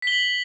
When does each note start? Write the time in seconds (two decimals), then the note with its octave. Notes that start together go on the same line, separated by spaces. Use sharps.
0.02 B6
0.07 G7
0.12 F#7